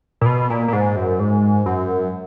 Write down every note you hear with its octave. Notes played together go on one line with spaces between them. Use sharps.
A#2
B2
A#2
A#2
G#2
F#2
G#2
F#2